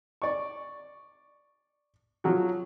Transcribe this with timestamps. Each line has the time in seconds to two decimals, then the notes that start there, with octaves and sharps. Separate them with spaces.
0.22 D5 C#6
2.24 F3 F#3 F#4